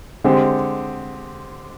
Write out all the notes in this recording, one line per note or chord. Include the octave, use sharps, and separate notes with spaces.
D3 G#3 C4 G4 C5